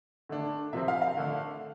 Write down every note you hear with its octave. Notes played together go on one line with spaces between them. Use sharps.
D3 A3 D4
C3 F3 C4 E5
F5
F5
D3 A3 D4